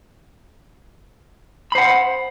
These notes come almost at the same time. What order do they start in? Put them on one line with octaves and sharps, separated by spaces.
B5 C5 F#5